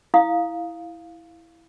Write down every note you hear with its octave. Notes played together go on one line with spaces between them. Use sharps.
E4 F5 D#6